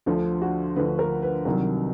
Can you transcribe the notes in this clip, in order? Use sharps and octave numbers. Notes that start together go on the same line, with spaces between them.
D2 D3 F3 F4
F#4
D2 D3 F3 B4
A#4
B4
C2 C3 D#3 F#3 A#4